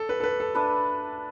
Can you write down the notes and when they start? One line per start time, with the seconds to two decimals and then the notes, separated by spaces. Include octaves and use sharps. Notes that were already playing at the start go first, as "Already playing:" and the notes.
Already playing: A4 D5
0.09 B4
0.20 A4
0.24 B4
0.40 A4
0.55 D4 B4 E5